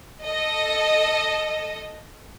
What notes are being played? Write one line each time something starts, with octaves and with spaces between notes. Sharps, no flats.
A4 D#5